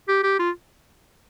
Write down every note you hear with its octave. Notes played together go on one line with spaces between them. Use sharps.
G4
G4
F4